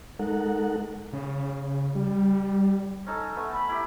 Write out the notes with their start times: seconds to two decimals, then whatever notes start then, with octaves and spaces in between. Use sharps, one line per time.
0.19 G#3 D#4 A4 A#4 F#5
1.13 C#3
1.95 G3
3.07 C#4 D#4 A4
3.35 A3 B3
3.53 B5
3.69 E4 G4